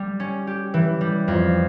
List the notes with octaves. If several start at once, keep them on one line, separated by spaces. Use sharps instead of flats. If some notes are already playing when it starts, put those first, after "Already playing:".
Already playing: G3
C#4
G4
E3
G3
F2